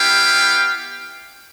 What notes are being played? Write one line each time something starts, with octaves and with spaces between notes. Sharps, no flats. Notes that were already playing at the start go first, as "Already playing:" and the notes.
Already playing: B3 E4 G4 F5 G5